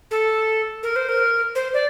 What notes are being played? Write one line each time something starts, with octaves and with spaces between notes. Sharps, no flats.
A4
A#4
C5
A#4
C5
D5